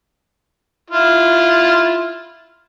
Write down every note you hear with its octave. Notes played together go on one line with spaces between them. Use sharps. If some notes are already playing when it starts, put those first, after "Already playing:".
E4 F4